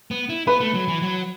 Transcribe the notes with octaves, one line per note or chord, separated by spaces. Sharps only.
B3
E4
B3 B4 B5
A3
F#3
E3
F#3